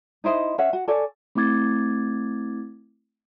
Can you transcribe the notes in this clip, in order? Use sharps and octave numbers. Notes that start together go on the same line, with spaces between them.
D#4 E4 C5 D#5
C#4 C#5 E5 F#5
F#4 F#5
A4 C#5 D5 G#5
A3 C4 E4 D6 G#6 A6